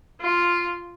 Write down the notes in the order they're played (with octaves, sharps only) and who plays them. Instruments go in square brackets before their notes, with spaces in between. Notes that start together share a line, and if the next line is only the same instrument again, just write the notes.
[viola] F4